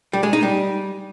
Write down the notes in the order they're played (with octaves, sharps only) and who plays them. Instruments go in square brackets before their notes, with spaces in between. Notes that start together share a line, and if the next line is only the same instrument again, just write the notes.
[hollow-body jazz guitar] G3
G#3
D#4
G3